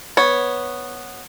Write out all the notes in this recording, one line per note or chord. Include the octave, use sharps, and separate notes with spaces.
B3 C#5